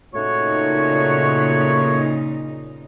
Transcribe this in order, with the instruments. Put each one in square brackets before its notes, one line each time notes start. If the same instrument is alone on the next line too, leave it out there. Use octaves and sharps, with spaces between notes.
[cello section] A#2 C#3 D#4 [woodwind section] A3 F#4 C#5